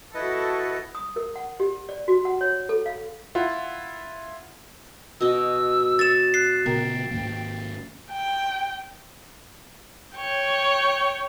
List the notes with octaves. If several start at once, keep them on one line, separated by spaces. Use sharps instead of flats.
E4 F#4 A4 B4 D#5
D#6
A#4
F#5
G4
D5
F#4
F#5
C#5
A4
F5
E4 F4 F#5
B2 D#5 E6
C#5 A6 E7
F#6 C7
A#2 C#3 B3 A#4 G5
G#2 D#3 A#3
G5
C#5 G5